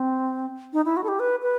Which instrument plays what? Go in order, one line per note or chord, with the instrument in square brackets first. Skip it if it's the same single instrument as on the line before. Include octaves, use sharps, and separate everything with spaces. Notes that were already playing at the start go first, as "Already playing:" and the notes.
Already playing: [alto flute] C4
D#4
E4
F#4
A4
G4
B4
B4